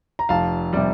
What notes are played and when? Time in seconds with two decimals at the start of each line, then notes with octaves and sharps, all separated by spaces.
0.19 A#5
0.29 F1 F5 A5
0.73 C3 G3 D5